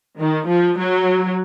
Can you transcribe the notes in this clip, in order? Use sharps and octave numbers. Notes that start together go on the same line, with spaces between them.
D#3
F3
F#3